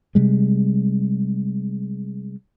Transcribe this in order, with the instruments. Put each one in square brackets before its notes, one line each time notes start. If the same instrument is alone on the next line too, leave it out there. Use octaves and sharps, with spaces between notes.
[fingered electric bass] C3 G3 G#3